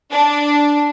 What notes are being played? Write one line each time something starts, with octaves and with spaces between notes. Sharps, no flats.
D4